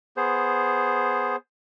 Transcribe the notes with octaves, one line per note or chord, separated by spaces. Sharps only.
B3 G#4 C5